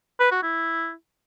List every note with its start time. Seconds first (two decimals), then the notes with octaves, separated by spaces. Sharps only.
0.20 B4
0.31 F#4
0.43 E4